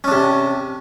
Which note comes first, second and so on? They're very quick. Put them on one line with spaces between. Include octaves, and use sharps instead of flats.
C#4 D4 C3